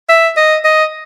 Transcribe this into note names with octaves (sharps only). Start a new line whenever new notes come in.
E5
D#5
D#5